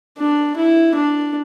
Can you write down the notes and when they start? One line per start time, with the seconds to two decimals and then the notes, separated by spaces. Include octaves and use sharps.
0.18 D4
0.57 E4
0.95 D4